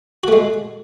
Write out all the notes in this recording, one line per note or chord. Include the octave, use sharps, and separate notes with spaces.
G#3 A3 F#4